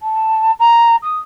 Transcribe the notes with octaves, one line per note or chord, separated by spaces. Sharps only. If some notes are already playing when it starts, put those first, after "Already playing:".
A5
A#5
D#6